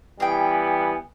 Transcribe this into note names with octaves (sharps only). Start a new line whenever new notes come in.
E3 G3 B3 G#4 G5